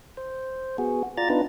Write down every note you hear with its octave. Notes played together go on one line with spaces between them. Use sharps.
C5
B3 F#4 G#4
F4 D5 A#5 A6
B3 D4 D#4 F4 B4